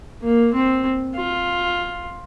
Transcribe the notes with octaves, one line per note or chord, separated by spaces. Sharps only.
A#3
C4
F4